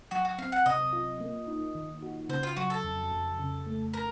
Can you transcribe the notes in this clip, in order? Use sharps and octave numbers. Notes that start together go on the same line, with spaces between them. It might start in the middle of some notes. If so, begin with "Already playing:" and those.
F#3 F#4
F#4
C4 F5
F#5
C3 D#5
F4
A#3
D#4
D#3
F#4
C#3 C5
F4
F#3 F#4
A4
F2
F2
C#3
A3
A#4